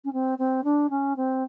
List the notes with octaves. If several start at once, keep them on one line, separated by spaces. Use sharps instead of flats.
C#4
C4
C4
D4
C#4
C4